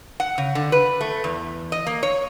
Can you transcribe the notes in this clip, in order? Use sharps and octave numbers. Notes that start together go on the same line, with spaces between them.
F#5
C#3
D3
B4
A3
E2
D#5
A#3
C#5